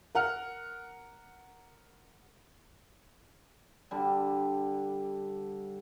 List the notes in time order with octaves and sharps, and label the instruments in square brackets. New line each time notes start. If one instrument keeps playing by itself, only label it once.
[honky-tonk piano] A#4 F#5 F6
[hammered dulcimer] D3 G3